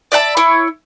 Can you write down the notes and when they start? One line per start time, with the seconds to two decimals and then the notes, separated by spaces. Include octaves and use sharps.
0.12 D5 E5 F#5 A5
0.37 E4 C#5